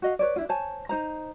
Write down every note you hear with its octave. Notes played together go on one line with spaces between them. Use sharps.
F#4 D#5 F5
B4 C#5 D5
D4 E4 F4
C5 C#5 G#5 A5
D#4 C5 A#5